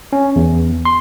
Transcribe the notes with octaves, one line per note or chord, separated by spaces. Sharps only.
C#4
E2
C6